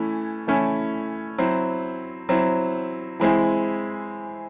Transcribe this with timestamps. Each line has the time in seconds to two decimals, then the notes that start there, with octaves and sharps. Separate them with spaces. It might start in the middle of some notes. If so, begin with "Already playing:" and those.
Already playing: E3 A3 C#4 E4
0.47 E3 A3 C#4 E4
1.38 F#3 C4 E4
2.29 F#3 C4 E4
3.20 E3 G#3 C4 E4